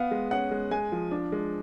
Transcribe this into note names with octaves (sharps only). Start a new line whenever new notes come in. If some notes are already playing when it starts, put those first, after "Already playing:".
Already playing: B3 F5
G#3
C#4 F#5
G#3
G#3 G#5
F3
D4
G#3